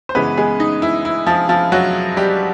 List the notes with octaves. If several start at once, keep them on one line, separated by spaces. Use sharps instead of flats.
C5
F#2 C#3 E3 G#3 B3 B4
G#3 G#4
D#4
E4
E4
F3 F4
F3 F4
F#3 F#4
G3 G4